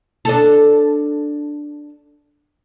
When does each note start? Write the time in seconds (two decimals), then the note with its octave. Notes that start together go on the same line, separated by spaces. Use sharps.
0.25 D4 A4